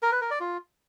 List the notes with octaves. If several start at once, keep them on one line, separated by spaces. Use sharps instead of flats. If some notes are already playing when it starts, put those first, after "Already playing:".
A#4
B4
A#4
D5
F4